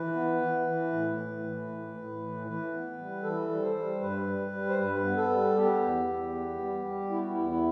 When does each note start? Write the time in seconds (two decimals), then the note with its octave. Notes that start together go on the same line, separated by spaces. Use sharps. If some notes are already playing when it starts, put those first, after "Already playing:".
Already playing: E3 B4
0.14 B3
0.41 E3
0.67 E3
0.92 A2
1.18 A2
1.44 E3
1.69 A2
1.95 A2
2.21 E3
2.47 E3 B4
2.73 B3
2.98 G3
3.23 E3 A4
3.49 G3
3.62 C5
3.75 G3
4.01 G2 B4
4.27 G3
4.52 G3
4.69 C5
4.79 G2 B4
5.04 B3
5.17 A4
5.30 G3
5.56 B3 G4
5.82 E2
6.08 E2
6.33 B3
6.59 G3
6.84 G3
7.10 B3 E4
7.20 F#4
7.30 E4
7.36 E2
7.49 E4